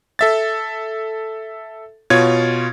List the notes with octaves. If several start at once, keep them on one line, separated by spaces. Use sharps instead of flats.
A4 E5 A6
B2 F4 C#5 G#6